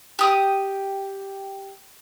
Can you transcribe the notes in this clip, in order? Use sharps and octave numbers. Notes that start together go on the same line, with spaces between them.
G4 D#6